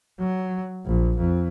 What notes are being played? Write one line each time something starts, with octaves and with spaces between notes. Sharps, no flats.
F#3
A#1
F2